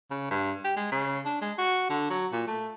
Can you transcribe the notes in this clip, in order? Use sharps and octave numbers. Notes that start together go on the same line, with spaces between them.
C#3
G2
G4
G#3
C#3
D4
G#3
F#4
D3
F#3
A#2
A3